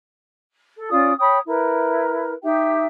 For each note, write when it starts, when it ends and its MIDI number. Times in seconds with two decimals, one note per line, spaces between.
0.77 0.88 69
0.90 1.13 61
0.90 1.13 65
0.90 1.13 74
0.90 1.13 87
1.18 1.37 73
1.18 1.37 79
1.18 1.37 83
1.18 1.37 87
1.46 2.32 64
1.46 2.32 70
1.46 2.32 71
2.42 2.85 63
2.42 2.85 67
2.42 2.85 76
2.42 2.85 79